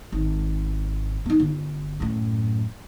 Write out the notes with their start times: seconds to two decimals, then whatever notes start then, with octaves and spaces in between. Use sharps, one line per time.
0.12 G#1
1.26 B3 D#4
1.40 G1
2.00 F#2 A2